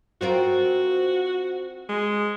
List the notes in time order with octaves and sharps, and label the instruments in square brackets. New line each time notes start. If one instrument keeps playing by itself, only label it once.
[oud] C4 F4 A#4 [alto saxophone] F#4
[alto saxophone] G#3